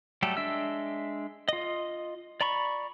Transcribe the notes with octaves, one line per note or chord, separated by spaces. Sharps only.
F#3 G3 A3 G4 A4
G#3 D4 E5 E6
F4 D#5
D5 A#5 B5 C#6